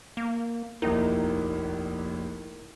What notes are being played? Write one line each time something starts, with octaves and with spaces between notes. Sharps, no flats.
A#3
F1 A#1 D#2 D#4 E4 A#4